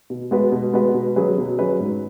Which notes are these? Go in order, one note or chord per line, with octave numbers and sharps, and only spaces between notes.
B2
G#3 B3 F#4 B4
B2
G#3 B3 F#4 B4
B2
F#3 C#4 G#4 B4
B2
F#3 C#4 G#4 B4
G#2